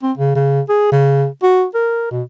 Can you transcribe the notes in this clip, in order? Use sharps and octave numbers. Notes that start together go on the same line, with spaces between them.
C4
C#3
C#3
G#4
C#3
F#4
A#4
B2